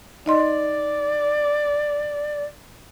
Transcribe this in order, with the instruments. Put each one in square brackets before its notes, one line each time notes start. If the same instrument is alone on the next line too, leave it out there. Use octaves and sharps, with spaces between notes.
[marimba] D#4 D#5 C6 [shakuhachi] D5